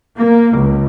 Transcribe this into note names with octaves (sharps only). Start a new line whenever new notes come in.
A#3
C#2